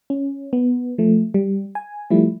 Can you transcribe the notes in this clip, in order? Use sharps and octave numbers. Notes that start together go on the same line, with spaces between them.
C#4
B3
F3 A3
G3
G#5
F3 G3 A3 E4